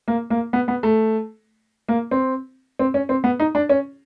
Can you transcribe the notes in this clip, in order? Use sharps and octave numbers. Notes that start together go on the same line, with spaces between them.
A#3
A#3
B3
B3
A3
A#3
C4
C4
C#4
C4
B3
D#4
D4
C#4